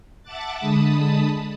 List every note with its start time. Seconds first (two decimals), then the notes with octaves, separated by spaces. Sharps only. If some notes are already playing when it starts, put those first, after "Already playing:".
0.23 E5 F#5 A5 D6 F#6 A6
0.58 D3 G#3 A5 B5 D#6